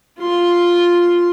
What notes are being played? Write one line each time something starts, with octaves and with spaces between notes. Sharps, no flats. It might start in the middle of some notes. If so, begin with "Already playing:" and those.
F4 C6